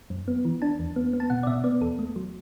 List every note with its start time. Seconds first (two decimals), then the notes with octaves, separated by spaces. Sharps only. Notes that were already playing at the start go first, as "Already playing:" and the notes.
0.10 F#2
0.28 B3
0.45 E3
0.62 D4 A5
0.79 E2
0.96 B3
1.13 B3
1.20 A5
1.30 B2 F#5
1.43 D5
1.47 B2 E5
1.64 B3 D5
1.81 E2 A4
1.99 A3
2.16 F#3